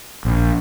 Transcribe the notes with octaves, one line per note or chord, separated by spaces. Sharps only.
A#1